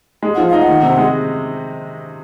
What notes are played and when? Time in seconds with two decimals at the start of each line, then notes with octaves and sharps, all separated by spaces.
0.23 G#3
0.35 F3 F#5
0.48 D#4 F5
0.59 F#5
0.68 D#3
0.83 C3
0.98 G#3